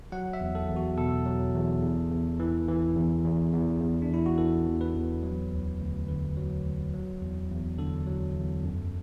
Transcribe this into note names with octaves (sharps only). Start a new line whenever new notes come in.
F#3 F#5
E5
E2
A4
E2
F#4
B2 A4
F#3
E2
E2
E2
E3
E3
E2
E2
E2
E2
D4
E3 E4
F#4
E3 A4
E2
B4
E2
F#3
D2
D2
D3 B4
F#3
D2
F#3
E2
E2
D3 A4
F#3
E2
F#2